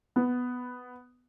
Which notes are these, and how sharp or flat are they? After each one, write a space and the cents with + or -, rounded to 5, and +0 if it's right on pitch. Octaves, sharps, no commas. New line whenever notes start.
B3 +5